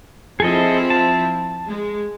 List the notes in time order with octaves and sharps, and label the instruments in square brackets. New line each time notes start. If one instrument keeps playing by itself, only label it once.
[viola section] F3 C4 E4 [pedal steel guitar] G#4 A4 D#5
[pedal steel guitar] A5
[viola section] G#3